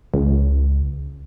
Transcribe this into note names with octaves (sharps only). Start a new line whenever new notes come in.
C#2